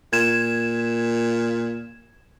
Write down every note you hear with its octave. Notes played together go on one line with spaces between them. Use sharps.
A#2 G#6 E7